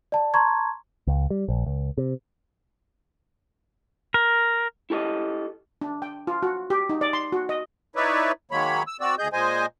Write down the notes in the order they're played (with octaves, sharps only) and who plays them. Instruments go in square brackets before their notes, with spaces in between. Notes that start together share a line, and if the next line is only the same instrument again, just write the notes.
[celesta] D5 A5
A5 A#5 C6 C#6 G#6
[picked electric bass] C#2
G3
A#1
C#2
C3
[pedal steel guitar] A#4
[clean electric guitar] E4 G4 A4 C#5 D#5
[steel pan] D4
G5
F4
F#4
G4
D#4
D5
C6
F#4
D#5
[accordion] D#4 E4 B4 C#5 D5 E5
D#3 F#3 G#3 A#3 C#5 B5
E6
C4 F#4 D5 E6
D2 G#4 D#5 G6
A#2 G#3 C5 D#5 G#5